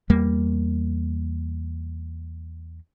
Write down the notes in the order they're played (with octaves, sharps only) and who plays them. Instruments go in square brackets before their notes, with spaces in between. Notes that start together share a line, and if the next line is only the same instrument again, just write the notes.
[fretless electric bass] E2 G3 A#3